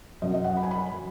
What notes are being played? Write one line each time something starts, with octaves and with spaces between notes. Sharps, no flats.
F#2 F#3 D#5
D#5
F#5
B5
G#5
B5
F#3